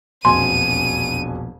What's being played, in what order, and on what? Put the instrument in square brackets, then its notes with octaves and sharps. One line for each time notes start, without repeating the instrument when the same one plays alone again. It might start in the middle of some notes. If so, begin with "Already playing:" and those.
[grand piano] E1 F2 G#5 [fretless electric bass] A#1 B2 [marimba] C6 [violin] D#7